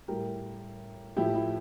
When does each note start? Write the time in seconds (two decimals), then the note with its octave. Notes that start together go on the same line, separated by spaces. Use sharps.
0.08 A2 G3 G4 A#4
1.17 A2 F3 E4 G4
1.35 E4